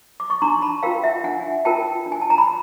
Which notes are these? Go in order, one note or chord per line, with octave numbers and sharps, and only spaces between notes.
D6
C#6
D4 A#5 C6
A5 B5
F4 A#4 F5 G5
E5 F#5
D4 F#5 G#5
F4 A#4 G5 A5
D4
G#5
A5
A#5
B5